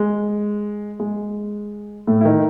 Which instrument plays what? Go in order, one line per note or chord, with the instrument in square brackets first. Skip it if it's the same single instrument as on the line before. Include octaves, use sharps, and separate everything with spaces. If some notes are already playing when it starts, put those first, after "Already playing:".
Already playing: [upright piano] G#3
G#3
A2 A3
E4
D#3 D#4